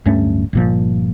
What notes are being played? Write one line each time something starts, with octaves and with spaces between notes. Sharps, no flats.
D1 G2 A3 C#4
G1 A#2 F3